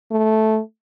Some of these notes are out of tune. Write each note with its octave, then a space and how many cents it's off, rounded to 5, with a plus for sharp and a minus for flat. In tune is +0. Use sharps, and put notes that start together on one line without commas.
A3 -10